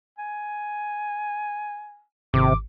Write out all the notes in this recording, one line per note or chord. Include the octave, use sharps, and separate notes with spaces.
G#5
G#1 C3 D6